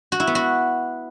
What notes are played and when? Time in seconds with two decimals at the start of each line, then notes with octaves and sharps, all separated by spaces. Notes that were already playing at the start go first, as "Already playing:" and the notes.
0.12 F#4
0.20 E4
0.27 B3
0.35 F#4